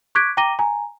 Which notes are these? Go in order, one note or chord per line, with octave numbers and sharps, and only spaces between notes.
C#6 D6 F#6 G#6 B6 D7
G5 A#5 D6 A#6 D#7 G7
G#5 A#5